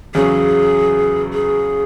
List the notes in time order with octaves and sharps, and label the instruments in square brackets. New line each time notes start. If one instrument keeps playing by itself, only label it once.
[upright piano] E2 C#3 F#3 C#4 [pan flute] G#4
[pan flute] G#4